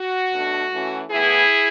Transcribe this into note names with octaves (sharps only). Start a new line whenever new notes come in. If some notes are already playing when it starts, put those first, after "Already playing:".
Already playing: F#4
B2 A3 D4
E3 A3 C#4
A2 E3 B3 E4 G#4